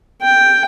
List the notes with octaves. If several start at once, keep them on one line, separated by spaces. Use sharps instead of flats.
G5